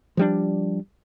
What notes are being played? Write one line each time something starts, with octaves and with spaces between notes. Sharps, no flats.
F3 G3 D4